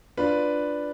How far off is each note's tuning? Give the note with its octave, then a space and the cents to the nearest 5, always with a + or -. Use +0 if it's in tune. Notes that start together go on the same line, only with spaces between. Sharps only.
D4 +0 F4 +0 B4 +0